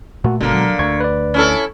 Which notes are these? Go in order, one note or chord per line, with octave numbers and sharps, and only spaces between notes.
A#2 A3 F#4
G1 B2 D3 G#3 A#3
F#3
D2 C#6 G#6
B4 D5
C#4 E4 A4